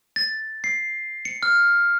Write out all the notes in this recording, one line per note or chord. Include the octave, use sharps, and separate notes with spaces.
A6
C7
C#7
F6